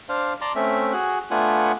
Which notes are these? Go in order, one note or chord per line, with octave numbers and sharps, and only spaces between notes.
D4 C5 F5
D5 A5 A#5 C6
A3 C4 C#4 E5
F#4 G#4 F#6
A3 B3 D4 F4 F#5 G#5